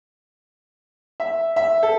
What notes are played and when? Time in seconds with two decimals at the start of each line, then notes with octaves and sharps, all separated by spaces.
1.20 E5
1.56 E5
1.83 A4